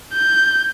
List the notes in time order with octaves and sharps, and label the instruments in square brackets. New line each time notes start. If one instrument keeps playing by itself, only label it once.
[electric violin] G6